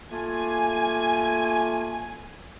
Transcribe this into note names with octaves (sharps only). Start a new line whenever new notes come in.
A3 A#3 F4 G#5